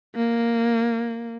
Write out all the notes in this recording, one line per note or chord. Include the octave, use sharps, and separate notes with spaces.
A#3